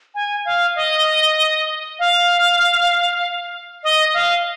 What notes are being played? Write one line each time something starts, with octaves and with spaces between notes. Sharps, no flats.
G#5
F5
D#5
F5
D#5
F5